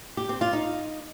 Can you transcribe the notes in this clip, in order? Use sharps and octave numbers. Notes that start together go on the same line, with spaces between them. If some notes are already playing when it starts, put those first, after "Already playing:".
G4
C4
F4
D#4